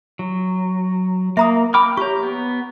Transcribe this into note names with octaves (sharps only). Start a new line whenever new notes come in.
F#3
A#3 E5 A#5 D#6
G5 B5 D6 F6
G4 C#5 A#5 C#6
B3